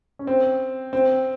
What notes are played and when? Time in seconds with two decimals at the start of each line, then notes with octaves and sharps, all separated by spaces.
0.19 C#4
0.27 C4
0.93 C4